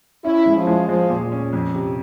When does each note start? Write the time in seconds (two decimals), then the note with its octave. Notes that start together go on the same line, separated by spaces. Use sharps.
0.24 C#4 E4
0.46 G#3
0.57 F3
0.67 G#3
0.89 F3 G#3
1.10 A#2
1.32 C#4
1.53 F2
1.74 C3